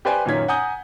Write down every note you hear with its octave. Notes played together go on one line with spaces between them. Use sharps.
G4 B4 C5 D5 G5 G#5
F#2 A#2 D#3 C#4 G#6 B6
F#5 G#5 A#5 D#6 G6